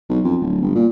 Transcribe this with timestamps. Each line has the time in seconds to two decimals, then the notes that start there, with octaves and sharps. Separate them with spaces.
0.09 B1
0.24 F2
0.41 D1
0.62 G1
0.75 A#2